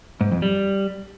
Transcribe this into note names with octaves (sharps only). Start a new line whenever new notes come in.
G#2
F2
G3